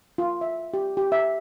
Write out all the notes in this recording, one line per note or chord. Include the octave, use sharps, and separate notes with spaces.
F4
E5
G4
G4
E5